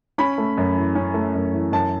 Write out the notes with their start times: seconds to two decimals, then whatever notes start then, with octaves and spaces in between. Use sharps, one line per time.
0.18 C#4 B5
0.38 A3
0.58 F#2
0.77 E3
0.95 C#4
1.14 A3
1.35 F#2
1.53 E3
1.72 F#2 A5